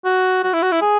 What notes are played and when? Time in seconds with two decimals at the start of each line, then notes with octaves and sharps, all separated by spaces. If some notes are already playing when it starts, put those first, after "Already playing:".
0.05 F#4
0.43 F#4
0.53 E4
0.62 F#4
0.72 E4
0.82 G#4